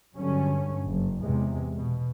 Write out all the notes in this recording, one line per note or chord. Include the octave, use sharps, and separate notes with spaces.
G2 D3 F#3 C#4
F#1
E2 C3 G#3
B2